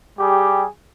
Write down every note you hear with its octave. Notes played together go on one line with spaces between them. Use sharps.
G3 G4 G#4